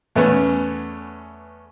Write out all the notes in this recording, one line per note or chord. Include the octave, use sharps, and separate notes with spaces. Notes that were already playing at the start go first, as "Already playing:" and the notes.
E2 A3 B3 C#4